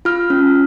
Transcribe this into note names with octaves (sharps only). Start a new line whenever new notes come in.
F4 F6
C#4